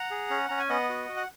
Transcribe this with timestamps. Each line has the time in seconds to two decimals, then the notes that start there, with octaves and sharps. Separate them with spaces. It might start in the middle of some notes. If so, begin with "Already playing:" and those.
Already playing: F#5 A#5
0.11 G#4
0.30 C#4
0.49 C#4 A#5
0.59 G#5
0.70 B3 D#5 F#5
0.89 F#4
1.09 F#4
1.17 F#5